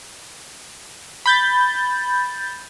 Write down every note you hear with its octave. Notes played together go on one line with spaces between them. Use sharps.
B5 G6 A6